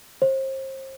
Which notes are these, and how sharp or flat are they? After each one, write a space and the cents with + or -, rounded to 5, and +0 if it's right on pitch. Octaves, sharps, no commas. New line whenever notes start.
C5 +35